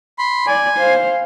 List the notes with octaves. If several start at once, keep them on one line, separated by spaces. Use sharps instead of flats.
B5 C6
D5 G#5
C5 F5